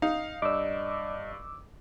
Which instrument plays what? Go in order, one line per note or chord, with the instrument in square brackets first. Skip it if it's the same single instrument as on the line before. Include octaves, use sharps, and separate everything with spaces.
[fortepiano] D#4 [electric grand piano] F5
[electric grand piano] G2 [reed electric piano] D5 D#5 [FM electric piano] D6 E6